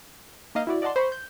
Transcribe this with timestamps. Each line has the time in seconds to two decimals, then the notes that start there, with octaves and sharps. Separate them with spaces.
0.55 A#3 D#4 D#5 F5
0.67 E4 F#4 D5
0.82 D5 D#5 F#5 A5 C6
0.96 C5 B5 C#6
1.12 G6